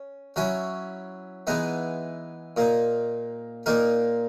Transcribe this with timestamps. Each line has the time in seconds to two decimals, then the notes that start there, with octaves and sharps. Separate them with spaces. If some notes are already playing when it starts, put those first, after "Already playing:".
Already playing: C#4
0.36 F#3 C#4 E4
1.47 E3 G#3 B3 D#4
2.57 A#2 A#3 D#4
3.66 A#2 A#3 D#4 A#4